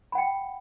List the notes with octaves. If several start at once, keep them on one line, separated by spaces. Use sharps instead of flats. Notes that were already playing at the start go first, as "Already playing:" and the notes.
F#5 G5 B5